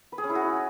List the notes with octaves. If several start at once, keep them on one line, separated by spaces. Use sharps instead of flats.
B4
G#4
C#4
E4
F#4